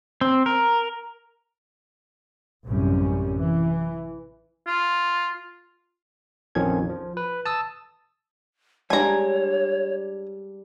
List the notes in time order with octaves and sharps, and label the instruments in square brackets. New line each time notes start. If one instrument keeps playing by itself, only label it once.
[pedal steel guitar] C4
A#4
[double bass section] A1 F#2 C3 G3 C#4
E3
[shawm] F4
[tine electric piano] A#1 F2 D#3 F3 C#4 G#6
F3
B4
A5 D#6 E6
[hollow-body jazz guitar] G3 G#3 D4 [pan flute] C#5 [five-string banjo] G#5 A#5